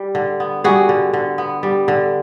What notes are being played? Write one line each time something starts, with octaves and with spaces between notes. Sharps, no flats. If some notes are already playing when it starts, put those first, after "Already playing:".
Already playing: G3
D3
B3
G3 F#4 G#4
D3
D3
B3
G3
D3